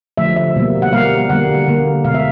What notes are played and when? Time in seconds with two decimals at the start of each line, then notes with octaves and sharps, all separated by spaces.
0.17 D3 F3 A3 E5
0.36 E5
0.56 B2 G3 A#3
0.82 F#5
0.92 B2 G3 A#3 F5
1.29 D3 G3 A#3 F#5
1.67 D3 G3 A#3
2.04 B2 G#3 F5
2.14 E5